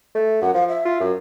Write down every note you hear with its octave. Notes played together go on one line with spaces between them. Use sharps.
A3
F#2 F#5
F3 F5
E5
F4
F#2